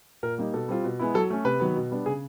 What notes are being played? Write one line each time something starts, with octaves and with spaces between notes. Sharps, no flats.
A#2 A#4
G3 A#3 D#4
B2 A4
G3 C4 F4
B2
G#3 B3 E4
F#3 A4
A3 C#4
C3 B4
D#3 F#3 B3
B2
G3 B3 D4
C#3 G#4